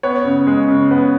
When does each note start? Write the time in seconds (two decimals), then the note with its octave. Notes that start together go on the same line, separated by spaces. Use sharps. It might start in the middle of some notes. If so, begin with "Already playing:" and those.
0.03 B3 C#5
0.25 C#3
0.47 G#3
0.69 C#3
0.91 B3